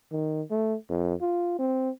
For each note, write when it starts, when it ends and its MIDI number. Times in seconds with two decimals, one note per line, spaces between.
0.12 0.42 51
0.51 0.76 57
0.90 1.14 41
1.21 1.56 65
1.59 1.90 60